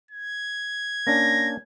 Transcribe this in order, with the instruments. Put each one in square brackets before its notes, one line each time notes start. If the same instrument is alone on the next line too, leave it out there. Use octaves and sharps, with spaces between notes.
[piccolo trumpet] G#6
[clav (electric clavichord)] A#3 C#4 D4 [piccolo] A#6